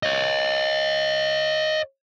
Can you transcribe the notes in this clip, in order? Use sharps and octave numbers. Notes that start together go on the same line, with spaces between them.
C#5 D#5